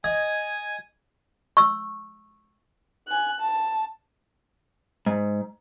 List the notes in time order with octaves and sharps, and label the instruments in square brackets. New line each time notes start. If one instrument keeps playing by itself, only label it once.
[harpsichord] D#5 [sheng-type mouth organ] G#5 [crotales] G#6
[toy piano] C#6 E6
[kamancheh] G#5 F#6
A5
[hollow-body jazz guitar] G#2